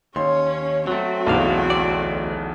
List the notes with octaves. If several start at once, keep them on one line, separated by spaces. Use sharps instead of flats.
D#2 C#4 C#5 C6
F#3 A3 C4 F#4
B1 E2 A3 D4 F5
D2 D5